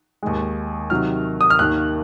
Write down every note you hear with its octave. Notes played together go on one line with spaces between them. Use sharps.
D#2 D#3 G#3
C3 D#3 F#3 F6
D#6
F6
D#2 D#3 A#3 F#6